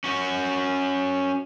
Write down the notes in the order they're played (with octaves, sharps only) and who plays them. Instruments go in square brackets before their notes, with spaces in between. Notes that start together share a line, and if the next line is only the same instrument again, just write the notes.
[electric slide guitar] C#4 F#4